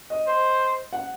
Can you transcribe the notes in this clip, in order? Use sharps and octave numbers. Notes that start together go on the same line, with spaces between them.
D#5
C5
F#5